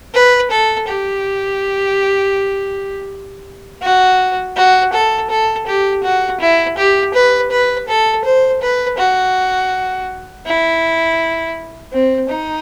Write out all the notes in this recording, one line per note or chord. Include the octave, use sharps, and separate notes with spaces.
B4
A4
G4
F#4
F#4
A4
A4
G4
F#4
E4
G4
B4
B4
A4
C5
B4
F#4
E4
C4
D#4